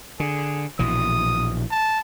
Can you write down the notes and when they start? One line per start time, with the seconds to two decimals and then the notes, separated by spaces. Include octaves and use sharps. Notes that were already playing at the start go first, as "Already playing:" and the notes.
0.20 D3 G#4
0.79 A#1 B2 E3 D#6
1.71 A5